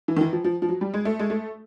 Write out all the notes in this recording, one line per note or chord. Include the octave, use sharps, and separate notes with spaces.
E3
D#3
E3
F3
F3
F3
F#3
G3
G#3
A3
G#3
A3